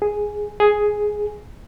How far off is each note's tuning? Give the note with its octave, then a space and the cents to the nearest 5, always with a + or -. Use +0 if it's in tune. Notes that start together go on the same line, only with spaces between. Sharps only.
G#4 +0
G#4 +5